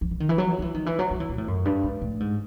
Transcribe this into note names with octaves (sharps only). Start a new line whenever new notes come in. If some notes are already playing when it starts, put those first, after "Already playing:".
F3
E3
D#3
E3
F#3
F3
E3
D#3
E3
F#3
F#3
E3
A#2
A2
F#2
G2
G#2
A2
G#2